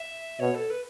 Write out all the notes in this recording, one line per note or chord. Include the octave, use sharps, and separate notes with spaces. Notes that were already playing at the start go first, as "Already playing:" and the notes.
Already playing: E5
B2 C#5
A4
B4